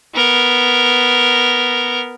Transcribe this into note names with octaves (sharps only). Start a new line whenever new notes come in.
B3 A#4